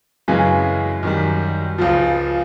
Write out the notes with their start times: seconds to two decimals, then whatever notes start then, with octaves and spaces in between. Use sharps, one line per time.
0.28 F#2 C#3 E3 G#3 C#4
1.03 F#2 D#3 G3
1.78 C#2 C#3 F3